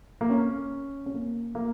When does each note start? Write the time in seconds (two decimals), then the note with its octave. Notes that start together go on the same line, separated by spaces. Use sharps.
0.21 A#3
0.30 C#4
1.06 C#4
1.14 A#3
1.55 A#3